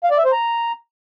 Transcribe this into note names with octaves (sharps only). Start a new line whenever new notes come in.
F5
D5
E5
C5
A#5